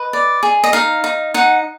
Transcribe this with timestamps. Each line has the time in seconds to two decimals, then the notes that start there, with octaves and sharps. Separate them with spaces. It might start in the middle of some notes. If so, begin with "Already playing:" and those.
Already playing: B4 D#5
0.13 D5
0.43 G#4
0.64 D#5
0.73 D#4 F5
1.04 D#4
1.34 D#4 F#5